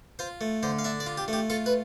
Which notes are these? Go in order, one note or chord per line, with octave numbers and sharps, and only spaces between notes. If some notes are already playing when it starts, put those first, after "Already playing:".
F4 C5
A3
D3 C5
F5
D4 E5
D5
F4
G4
A3 G4
F4 A4
B4